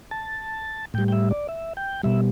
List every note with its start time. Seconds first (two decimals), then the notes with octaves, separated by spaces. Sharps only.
0.11 A5
0.94 A2 G3 G5
1.08 G5
1.12 E5
1.31 D5
1.49 E5
1.77 G5
2.03 B2 G3 E5